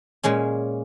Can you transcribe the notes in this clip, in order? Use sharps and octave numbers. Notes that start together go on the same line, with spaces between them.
A#2 G#3 C#4 G#4